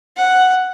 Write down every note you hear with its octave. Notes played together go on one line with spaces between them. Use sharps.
F#5